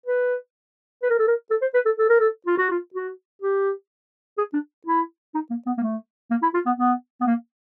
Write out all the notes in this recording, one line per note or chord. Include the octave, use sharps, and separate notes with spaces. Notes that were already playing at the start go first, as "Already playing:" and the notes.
B4
B4
A#4
A4
A#4
A4
C5
B4
A4
A4
A#4
A4
F4
F#4
F4
F#4
G4
G#4
D4
E4
D#4
A#3
B3
A#3
A3
A#3
E4
F4
B3
B3
B3
A#3